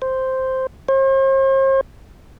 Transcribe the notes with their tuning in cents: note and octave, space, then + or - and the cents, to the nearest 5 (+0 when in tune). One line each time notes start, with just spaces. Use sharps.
C5 +0
C5 +45